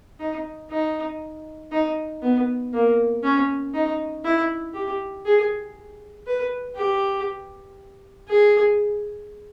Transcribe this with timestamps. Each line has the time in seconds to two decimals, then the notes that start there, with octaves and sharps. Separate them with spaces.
0.20 D#4
0.71 D#4
1.72 D#4
2.22 B3
2.73 A#3
3.23 C#4
3.74 D#4
4.24 E4
4.74 G4
5.25 G#4
6.26 B4
6.76 G4
8.28 G#4